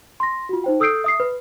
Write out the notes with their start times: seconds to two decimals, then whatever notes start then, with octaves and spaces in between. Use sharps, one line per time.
0.20 C6 A#6
0.49 F4 F#4
0.64 D#4 C5 G5
0.80 A4 D#6 E6 G6 C7 D7
1.04 E5 D#6 C7
1.20 B4